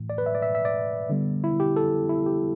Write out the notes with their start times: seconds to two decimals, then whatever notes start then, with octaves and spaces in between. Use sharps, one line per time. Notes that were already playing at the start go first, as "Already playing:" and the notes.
Already playing: A2 E3 A3
0.10 D5
0.18 B4
0.26 E5
0.35 D5
0.42 E5
0.55 E5
0.65 D5
1.10 D3 G3 B3
1.44 E4
1.60 G4
1.76 A4
2.09 E4
2.26 G4